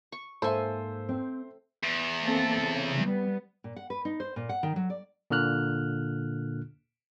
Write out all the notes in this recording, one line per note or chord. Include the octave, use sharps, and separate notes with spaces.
C#6
G#2 A#3 A4 C5 E5 G#5 E6
C4
E2
A#3 C4 A4
C#3
G3 B3
A#2
F#5
B4
D#4
C5
A#2
F#5
D#3
F#3
D5
A#2 D3 A#3 F6 F#6